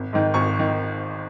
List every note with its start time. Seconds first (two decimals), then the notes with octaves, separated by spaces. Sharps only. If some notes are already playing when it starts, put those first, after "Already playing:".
Already playing: G#1
0.13 G#2 D#3
0.34 G#1 C#6
0.59 D#3